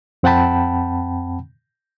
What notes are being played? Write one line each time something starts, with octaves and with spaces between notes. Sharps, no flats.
F2 C4 F#5 G5 A5 B5